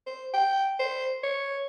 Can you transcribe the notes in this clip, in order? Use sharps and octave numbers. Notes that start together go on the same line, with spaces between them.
C5
G5
C5
C#5